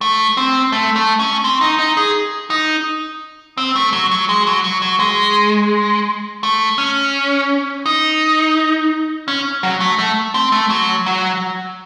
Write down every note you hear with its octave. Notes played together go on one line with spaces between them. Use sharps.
A3
C4
A3
A3
C#4
C4
D#4
D#4
G#4
D#4
C4
A3
F#3
F#3
G#3
F#3
F#3
F#3
G#3
A3
C#4
D#4
C#4
F#3
A3
A3
C4
A3
F#3
F#3